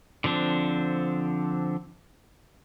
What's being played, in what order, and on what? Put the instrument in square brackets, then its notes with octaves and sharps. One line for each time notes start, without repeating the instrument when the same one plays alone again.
[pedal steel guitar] D3 F3 C4 D4